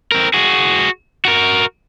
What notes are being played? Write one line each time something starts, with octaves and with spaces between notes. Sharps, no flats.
C4 A#4
F#4 G#4
F#4 A#4